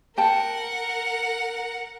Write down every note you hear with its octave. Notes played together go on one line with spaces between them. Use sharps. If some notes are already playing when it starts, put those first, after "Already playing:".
A#4 F#5 G5 A5